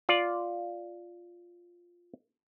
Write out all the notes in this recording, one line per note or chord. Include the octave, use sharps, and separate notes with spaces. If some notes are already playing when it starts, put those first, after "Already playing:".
F4 D5